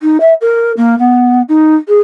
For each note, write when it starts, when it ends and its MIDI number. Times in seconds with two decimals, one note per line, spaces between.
0.01 0.18 63
0.20 0.33 76
0.41 0.72 70
0.77 0.98 58
0.99 1.42 59
1.48 1.75 63
1.88 2.00 68